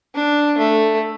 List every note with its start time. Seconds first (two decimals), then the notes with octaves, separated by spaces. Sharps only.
0.15 D4
0.58 A3